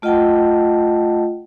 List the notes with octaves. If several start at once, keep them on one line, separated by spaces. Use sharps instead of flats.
A3 F4 D#5 F#5 G5 A5